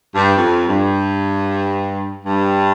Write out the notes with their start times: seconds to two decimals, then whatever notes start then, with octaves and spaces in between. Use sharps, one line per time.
0.15 G2
0.37 F2
0.68 G2
2.26 G2